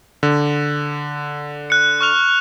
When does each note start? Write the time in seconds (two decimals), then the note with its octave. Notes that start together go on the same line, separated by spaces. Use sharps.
0.23 D3
1.70 F#6 C#7
2.01 C#6 F6 F7